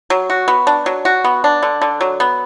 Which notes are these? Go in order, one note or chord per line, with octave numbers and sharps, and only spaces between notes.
F#3
F#4
B3
D4
F#3
F#4
B3
D4
D3
D3
F#3
B3